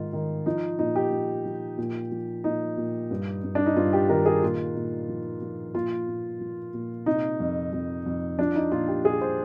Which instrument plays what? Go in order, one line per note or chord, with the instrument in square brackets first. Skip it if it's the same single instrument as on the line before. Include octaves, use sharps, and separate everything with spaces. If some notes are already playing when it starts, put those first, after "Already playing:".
Already playing: [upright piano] G#2 D#3 F4
D#3
F3 D#4
A#2 D#4
G4
F3
F3
A#2
F3
A#2 D#4
A#2
G2
G2
D4
D#4
G2 F4
G4
D#3 A#4
G#4
A#2 F4
A#2
F3
F3
A#2 F4
A#2
F3
A#2
C3 D#4
F2
F2
F2
F3 D4
D#4
A#2 F4
G4
A#2 G#4
C5